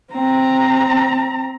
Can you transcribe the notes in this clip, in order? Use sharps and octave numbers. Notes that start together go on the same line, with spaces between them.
C4 A#5